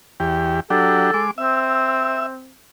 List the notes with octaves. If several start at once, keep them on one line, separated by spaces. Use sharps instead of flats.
E2 G4
F#3 D4 G4 A4
G#3 D6
C4 E5